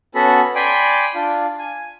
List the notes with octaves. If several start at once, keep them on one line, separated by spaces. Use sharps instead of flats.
B3 C#4 F#4 A4 B5
D5 G5 G#5 B5 C6
D4 F4
G#5